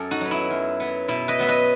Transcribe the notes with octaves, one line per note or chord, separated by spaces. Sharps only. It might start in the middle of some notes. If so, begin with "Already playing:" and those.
Already playing: F#2 A4
D#4 F#4
F#3 B3
E4
F#2
F#3 B3
B2 E4
B4 D#5
F#3 B3 E5
B4 D#5